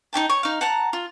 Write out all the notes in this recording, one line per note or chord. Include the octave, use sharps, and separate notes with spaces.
D#4 E4 G5 A5
C#5
D#4 F5
F#5 A5 A#5
F4